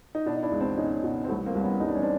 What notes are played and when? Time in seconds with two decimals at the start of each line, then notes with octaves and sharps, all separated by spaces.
0.15 D#4
0.26 B2 D4 E4
0.35 D#4
0.43 D4 E4
0.51 C#2
0.60 C4 D4
0.77 B2 C#4 D#4
1.04 B2
1.25 C4
1.29 C2 A3 B3
1.46 A#3 C4
1.55 C2
1.63 B3 C#4
1.80 C2 D#4
1.88 D4
1.95 C#4
2.02 C4 D4